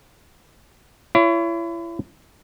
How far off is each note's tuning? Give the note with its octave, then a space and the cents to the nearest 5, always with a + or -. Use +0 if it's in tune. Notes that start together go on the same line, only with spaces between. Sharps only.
E4 +35 C#5 +20